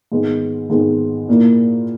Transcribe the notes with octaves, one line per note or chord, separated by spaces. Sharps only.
G#2 D#3 G#3 B3
G#2 D#3 G#3 B3
A#2 A#3 E4